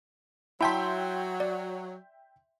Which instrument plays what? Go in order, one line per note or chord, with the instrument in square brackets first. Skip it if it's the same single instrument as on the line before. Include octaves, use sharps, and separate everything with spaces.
[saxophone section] F#3 [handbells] E4 A5 B6 [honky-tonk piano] E5 G5 C6
[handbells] D5